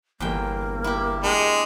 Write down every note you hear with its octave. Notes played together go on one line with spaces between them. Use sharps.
G1 E2 A#3 G5
E4 G4
G#3 D4 G4